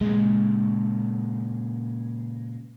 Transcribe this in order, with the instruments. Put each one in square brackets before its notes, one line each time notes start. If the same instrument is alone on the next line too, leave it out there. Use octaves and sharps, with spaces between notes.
[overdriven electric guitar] A#2 C#3 [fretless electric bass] G#3